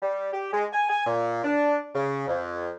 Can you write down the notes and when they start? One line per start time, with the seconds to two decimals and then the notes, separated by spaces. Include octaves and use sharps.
0.03 G3
0.33 G4
0.53 G#3
0.73 G#5
0.90 G#5
1.07 A#2
1.44 D4
1.95 C#3
2.28 F2